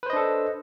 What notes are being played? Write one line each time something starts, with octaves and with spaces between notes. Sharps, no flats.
D4 A4 B4 C5 D#5